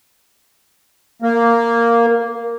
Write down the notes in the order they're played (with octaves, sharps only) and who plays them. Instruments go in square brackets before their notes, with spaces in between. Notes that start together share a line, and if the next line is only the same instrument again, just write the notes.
[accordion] A#3